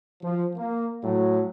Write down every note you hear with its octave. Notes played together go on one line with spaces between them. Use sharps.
F3
A#3
A2 F#3